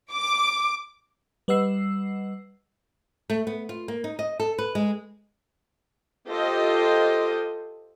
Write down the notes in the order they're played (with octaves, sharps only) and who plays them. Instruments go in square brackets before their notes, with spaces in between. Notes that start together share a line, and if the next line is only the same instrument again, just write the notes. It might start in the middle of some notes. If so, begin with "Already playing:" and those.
[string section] D6
[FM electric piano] G3 B4 D#5 F#5 E6 C7
[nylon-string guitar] A3
B3
F4
A#3
D#4
D#5
A4
B4
G#3
[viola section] F4 G4 A4 C5 D#5